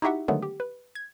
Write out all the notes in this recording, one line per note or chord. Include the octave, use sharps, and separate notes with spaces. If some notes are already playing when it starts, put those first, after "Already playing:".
D#4 E4 F#4 G4 E5 F#5
D3 D#3 F#3 G#3 A3 B3
G4
B4
G#6